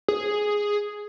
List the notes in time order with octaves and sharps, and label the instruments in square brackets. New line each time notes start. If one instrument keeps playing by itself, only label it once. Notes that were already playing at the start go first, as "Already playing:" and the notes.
[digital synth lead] G#4